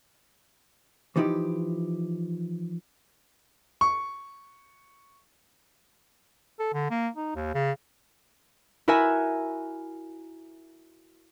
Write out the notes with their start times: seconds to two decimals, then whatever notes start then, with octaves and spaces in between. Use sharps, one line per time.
1.16 E3 F3 D#4 E4 G4
3.81 C#6
6.59 A4
6.73 D3
6.91 A#3
7.16 D#4
7.35 D#2
7.54 C#3
8.88 E4 F#4 A#4 E5 G#5